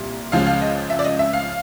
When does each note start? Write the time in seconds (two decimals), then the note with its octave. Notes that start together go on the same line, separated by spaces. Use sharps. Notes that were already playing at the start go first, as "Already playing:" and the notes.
Already playing: C2 A#2 G3
0.32 C#2 C#3 F3 G#3 F5
0.46 F5
0.62 D#5
0.90 E5
0.99 D5
1.05 D#5
1.19 E5
1.33 F5